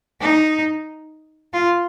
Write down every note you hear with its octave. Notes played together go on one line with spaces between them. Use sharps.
D#4
F4